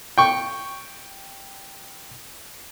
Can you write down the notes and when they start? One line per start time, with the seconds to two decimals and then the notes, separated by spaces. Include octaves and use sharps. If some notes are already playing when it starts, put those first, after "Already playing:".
0.18 G5 C#6